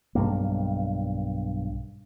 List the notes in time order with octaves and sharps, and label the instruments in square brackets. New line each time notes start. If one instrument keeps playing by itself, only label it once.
[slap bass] B1 G2 A#3